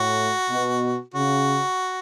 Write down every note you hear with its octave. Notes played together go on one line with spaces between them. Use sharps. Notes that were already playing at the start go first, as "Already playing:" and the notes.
Already playing: A2 F#4
B2
C#3 F#4